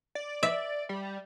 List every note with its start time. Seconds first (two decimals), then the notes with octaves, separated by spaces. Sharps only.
0.15 D5
0.43 E5
0.89 G3